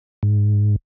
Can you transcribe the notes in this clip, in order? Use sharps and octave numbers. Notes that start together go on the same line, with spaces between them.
G#2